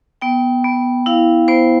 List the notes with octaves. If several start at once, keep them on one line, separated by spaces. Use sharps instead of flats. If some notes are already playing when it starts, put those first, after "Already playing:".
B3 G5
B3
E4 F5
B3 C5